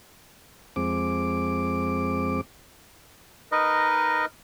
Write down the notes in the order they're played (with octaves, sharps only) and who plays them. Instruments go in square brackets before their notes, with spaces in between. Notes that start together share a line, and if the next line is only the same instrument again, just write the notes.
[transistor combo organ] F2 G#3 C4 D6
[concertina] D#4 A#4 B4 D#5